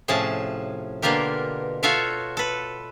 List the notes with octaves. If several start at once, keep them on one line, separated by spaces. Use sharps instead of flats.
A2 C3 F3 C#4 G#4 A5
B2 D3 A#3 F4 G4 A#4
F4 F#4 A4 C#5 E5 F5
A4 B4